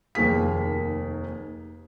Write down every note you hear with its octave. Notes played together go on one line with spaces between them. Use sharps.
F1 D#2 A#3 G#4 B6